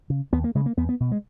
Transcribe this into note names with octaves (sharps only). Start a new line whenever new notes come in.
C#3
D#2 B3
A#3
C#3 G#3
A#3
E2 B3
B3
B2
G#3